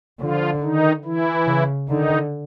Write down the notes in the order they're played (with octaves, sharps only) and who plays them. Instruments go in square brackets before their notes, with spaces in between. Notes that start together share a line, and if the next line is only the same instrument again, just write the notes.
[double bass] D3 [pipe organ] F3 F4
[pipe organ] D#3 D#4
E3 E4
[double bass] C#3
[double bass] D3 [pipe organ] D#3 D#4